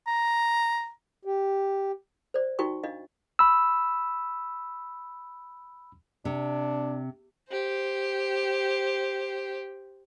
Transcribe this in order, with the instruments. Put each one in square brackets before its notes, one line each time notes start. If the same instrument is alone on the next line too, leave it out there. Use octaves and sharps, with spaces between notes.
[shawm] A#5
[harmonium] G4
[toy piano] C5 D5
D#4 F4 F#4 G5 C#6
D4 F4 D#5 F5
[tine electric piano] B5 E6
[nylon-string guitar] C3 [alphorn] D4
[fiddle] G4 C5